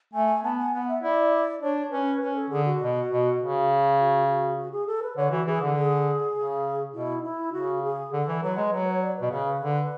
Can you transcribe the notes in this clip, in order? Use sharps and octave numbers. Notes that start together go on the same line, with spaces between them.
A3 G#5
B3 A5
G#5
B3 F#5
E5
E4 D5
D4 C#5
C#4 B4
C#4 B4
B4
A4
D3 G#4
F#4
B2
B2
C#3
F#4
F#4
F#4
G#4
A4
B4
D3 C#5
E3 F#4
E3 G#4
D3
G#4
C#3
B2 E4
E4
C#3 F#4
G#4
D3 A4
E3
F#3 B4
G#3
F#3 B4
C#5
D5
B4
B2
C#3
D3